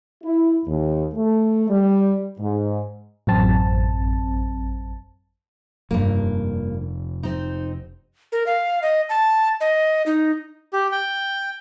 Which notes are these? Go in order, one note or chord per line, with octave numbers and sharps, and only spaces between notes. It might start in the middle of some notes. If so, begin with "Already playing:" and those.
E4
D#2
A3
G3
G#2
A1 F#2 C4 A5
F1 G2 A#3
C4 D#4
A#4
F5
D#5
A5
D#5
D#4
G4
G5